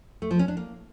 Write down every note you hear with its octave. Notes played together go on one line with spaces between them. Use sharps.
A3
F3
C#4
D4
A#3